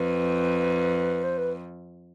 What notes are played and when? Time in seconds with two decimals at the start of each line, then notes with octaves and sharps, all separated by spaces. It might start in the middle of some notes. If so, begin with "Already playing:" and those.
Already playing: F2 B4
1.23 C5
1.37 B4